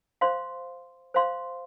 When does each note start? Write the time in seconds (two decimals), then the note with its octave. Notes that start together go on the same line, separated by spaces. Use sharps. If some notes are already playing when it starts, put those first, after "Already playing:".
0.21 C5 F5 C6
1.14 C5 F5 C6